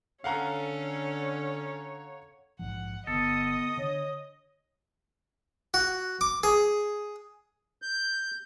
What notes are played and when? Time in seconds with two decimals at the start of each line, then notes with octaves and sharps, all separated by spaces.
0.24 D3 C#4 A4 C#5 F5 F#5 A#5
2.59 A#1 G#2 F3 F#5
3.07 G1 D3 B3 A4 D#5 D#6
3.77 D3 D4 C#5
5.74 F#4
6.21 D6
6.43 G#4
7.82 G6